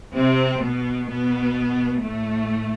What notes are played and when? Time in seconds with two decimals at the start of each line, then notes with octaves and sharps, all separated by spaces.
0.15 C3 C4
0.62 B2 B3
1.09 B2 B3
2.03 A2 A3